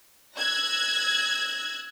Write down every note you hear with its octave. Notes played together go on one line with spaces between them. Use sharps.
E6 F#6 G#6 A#6